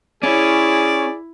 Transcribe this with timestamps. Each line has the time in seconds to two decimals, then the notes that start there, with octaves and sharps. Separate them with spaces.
0.23 C#4 E4 G#4 D5